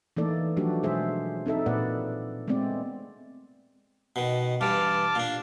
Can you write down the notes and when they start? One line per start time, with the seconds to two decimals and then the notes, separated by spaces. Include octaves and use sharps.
0.17 E3 A3 A#3 D#4 A4 D5
0.57 F3 F#3 A3 D4 F#4 G4
0.83 B2 G#3 G#4 C5 E5
1.46 C4 D#4 A4 E5
1.66 A#2 A#3 B4 D5 F#5
2.48 G#3 A3 B3 C4 D5
4.16 B2 D#3
4.61 G2 E3 A5 D6 F6
5.15 A#2 D4